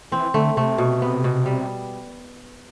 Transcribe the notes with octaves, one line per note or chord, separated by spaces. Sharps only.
E3 C4
D3 A3
C3 A3
B2
B3
B2
G3